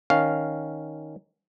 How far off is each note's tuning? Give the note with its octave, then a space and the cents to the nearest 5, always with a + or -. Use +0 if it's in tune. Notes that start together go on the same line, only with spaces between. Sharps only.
D#3 +0 C#4 +0 F5 +0